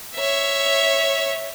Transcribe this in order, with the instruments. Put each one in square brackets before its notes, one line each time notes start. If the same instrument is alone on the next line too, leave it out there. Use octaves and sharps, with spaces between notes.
[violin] C#5 E5